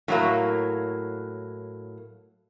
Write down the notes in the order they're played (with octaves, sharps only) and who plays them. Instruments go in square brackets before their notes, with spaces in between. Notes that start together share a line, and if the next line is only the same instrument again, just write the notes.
[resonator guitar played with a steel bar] A2 F#3 A#3